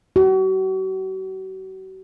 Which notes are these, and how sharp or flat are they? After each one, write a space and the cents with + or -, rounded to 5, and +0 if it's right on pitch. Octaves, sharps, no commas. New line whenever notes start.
F#4 +40